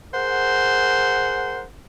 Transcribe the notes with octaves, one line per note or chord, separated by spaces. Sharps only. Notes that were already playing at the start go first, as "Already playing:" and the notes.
G#4 A#4 C5 F#5